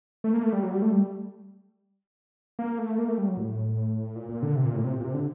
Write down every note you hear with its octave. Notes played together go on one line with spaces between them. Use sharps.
A3
A#3
A3
G3
F#3
G3
A3
G3
A#3
A3
A#3
A3
G3
F#3
A2
A#2
A#2
D3
C3
A#2
A2
C3
A#2
C3
D3